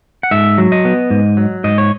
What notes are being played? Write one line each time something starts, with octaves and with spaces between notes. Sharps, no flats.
F#5
G#2 E5
F#3
D#5
B3
G#2
F#3
G#2 D#5
C#5